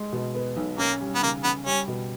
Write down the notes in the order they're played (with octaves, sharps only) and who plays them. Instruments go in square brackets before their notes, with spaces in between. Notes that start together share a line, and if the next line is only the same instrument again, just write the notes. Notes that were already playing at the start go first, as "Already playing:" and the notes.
Already playing: [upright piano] G#3
B2
B3
B1
[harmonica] A#3 [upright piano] C#4
[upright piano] G3
[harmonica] B3
[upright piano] C#3 [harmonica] A#3
[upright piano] C#3 [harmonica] B3
[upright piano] G3 [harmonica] C#4
[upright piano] B2